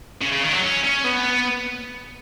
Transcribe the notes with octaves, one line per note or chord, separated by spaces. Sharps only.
C#3
C#3
D#3
F#3
C#4
C#4
B3